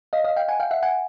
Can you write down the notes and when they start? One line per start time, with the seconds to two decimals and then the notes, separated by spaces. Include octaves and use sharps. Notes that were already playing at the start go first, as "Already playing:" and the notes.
0.13 D#5 F5
0.24 D#5 F5
0.36 F5 G5
0.48 F#5 G#5
0.60 F5 G5
0.71 E5 F#5
0.83 F#5 G#5